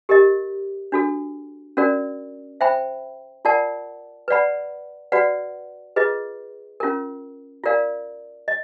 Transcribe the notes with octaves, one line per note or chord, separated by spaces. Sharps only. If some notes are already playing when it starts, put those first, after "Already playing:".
G4 A#4 D#5
D4 F#4 A4
C#4 F#4 A#4 D5
C5 E5 G5 B5
F4 A#4 D5 F#5 A5
B4 D5 F#5 B5
F#4 B4 D5 F#5
F4 G#4 B4 D#5
C#4 F4 A#4
F4 A#4 D5 F5
D#5